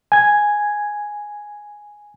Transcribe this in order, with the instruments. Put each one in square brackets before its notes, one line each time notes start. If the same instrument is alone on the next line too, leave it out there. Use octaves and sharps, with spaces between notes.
[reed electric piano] G#5 G#6